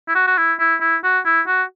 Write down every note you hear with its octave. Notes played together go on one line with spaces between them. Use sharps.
E4
F#4
F#4
E4
E4
E4
F#4
E4
F#4